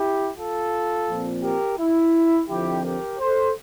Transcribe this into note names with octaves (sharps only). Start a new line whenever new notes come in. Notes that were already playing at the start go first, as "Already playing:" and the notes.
Already playing: E4 G4
F4 A4
A#2 F3 C4
G4 A#4
E4
F2 D3 F3 C4 E4 G4
G4 A#4
A4 C5